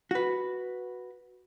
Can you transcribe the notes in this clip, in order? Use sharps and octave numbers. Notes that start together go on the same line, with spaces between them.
F#4 B4